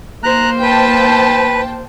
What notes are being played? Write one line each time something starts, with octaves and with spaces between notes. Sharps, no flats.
A#3 C5 A#5 F#6
B4 G5 A5